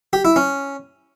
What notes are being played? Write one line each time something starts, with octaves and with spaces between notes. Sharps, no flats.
G4
E4
C#4